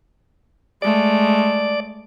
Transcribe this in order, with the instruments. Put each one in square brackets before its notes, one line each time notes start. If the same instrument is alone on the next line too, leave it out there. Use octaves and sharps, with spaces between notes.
[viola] G#3 A3 [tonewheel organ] D5